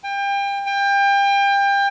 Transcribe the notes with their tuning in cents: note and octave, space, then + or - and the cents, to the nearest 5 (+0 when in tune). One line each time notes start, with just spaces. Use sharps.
G5 +30
G5 +30